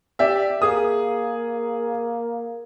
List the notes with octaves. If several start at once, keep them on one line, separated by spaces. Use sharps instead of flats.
G4 D5 E5
A#3 G#4 D#6